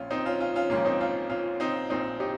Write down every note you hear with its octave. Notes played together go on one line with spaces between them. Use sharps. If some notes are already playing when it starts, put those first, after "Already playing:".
Already playing: A#1 A#2 F3 C#4 F4
C4 D#4
C#4 F4
C#4 F4
C#4 F4
G#1 G#2 F3 A#3 C#4
C4 D#4
C#4 F4
C#4 F4
C4 D#4
A#1 A#2 F3 C4 D#4
D#4 G4